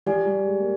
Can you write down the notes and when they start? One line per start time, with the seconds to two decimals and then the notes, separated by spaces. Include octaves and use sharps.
0.06 F3 G4 D5 G#5
0.25 G3
0.46 G#3
0.60 A#3